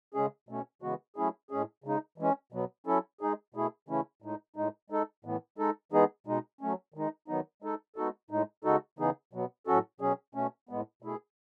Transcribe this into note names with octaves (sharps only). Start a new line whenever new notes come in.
C#3 G#3 C#4 G#4
B2 A3 C#4
C#3 E3 G#3 B3 F#4
F#3 A3 C#4 E4 G#4
A2 G#3 C#4 G#4
C#3 G#3 D#4
E3 G#3 C#4
B2 F#3 B3
F#3 C#4 E4 A4
G#3 D#4 G#4
B2 A3 E4 G#4
C#3 E3 A3 C#4 E4
A2 G#3 D#4
A2 G#3 D#4
G#3 D#4 A4
A2 E3 B3
G#3 D#4 A4
E3 G#3 B3 D#4 G#4
B2 G#3 D#4
F#3 A3 C#4
D#3 G#3 D#4
D#3 F#3 B3 D#4
G#3 D#4 A4
G#3 B3 D#4 F#4 A4
A2 G#3 D#4
C#3 G#3 D#4 F#4 A4
C#3 E3 B3 D#4 G#4
B2 F#3 B3
A2 F#3 C#4 F#4 A4
B2 F#3 C#4 G#4
B2 A3 C#4
A2 G#3 B3
B2 A3 E4 G#4